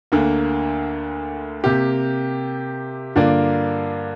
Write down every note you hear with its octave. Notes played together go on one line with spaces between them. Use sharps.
D2 D3 A#3
C3 A#3 G4
G2 D3 A#3 F4 D5